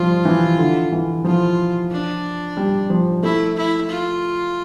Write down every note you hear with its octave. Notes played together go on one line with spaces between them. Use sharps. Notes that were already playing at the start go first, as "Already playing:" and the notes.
Already playing: F3 G3 F4
E3
D3
E3
F3 F4
D4
G3
F3
A3 E4
E4
F4